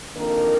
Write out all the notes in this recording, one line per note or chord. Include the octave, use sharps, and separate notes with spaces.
F2 D#3 A#3 D4 A#4